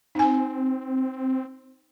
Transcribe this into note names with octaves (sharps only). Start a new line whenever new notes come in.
C4 D#4 G#5